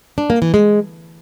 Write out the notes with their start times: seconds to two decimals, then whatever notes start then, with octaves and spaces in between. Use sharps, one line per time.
0.18 D4
0.30 A#3
0.42 E3
0.54 G#3